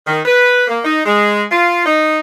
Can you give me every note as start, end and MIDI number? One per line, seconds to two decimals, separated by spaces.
0.05 0.19 51
0.26 0.63 71
0.68 0.78 58
0.84 1.02 63
1.05 1.44 56
1.51 1.82 65
1.85 2.20 63